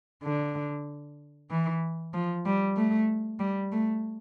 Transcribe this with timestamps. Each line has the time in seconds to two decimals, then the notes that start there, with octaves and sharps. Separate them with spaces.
0.24 D3
1.50 E3
2.14 F3
2.46 G3
2.77 A3
3.40 G3
3.72 A3